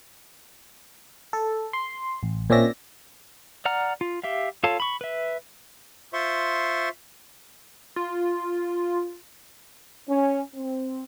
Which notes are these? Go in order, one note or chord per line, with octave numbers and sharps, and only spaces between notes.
A4
C6
A1
A#2 C4 C#4 D5 E5 A#6
D5 F#5 A#5 F6
F4
G4 E5 F5
F4 A4 C#5 F5 A5
B5 C#6
B4 E5
F4 C5 E5 C6 C#6
F4
C#4
C4